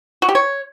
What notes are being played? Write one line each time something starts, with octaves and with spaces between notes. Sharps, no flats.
F#4
G4
C#5